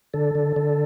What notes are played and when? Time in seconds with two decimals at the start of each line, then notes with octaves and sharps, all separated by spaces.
0.14 D3 A4
0.35 D3
0.56 D3